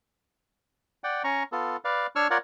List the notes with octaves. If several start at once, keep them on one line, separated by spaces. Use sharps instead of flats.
D5 F#5 G5
C#4 A#5 C#6
B3 F4 A4
B4 D5 F5
D4 C#5 C#6 E6 F6
F4 A#4 C#5 D5 F#5